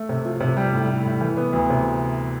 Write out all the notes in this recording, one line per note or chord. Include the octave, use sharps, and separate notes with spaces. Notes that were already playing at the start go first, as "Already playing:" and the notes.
Already playing: A3
C3
F3
C3
G3
A2
A2
A2
E3
B3
D2
C3